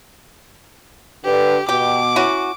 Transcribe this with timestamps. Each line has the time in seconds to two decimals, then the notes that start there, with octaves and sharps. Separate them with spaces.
1.25 D3 G4 B4
1.69 B2 G4 D6
2.16 C#4 E4 F#4